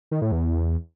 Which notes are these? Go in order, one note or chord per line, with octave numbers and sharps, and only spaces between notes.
D#3
A2
E2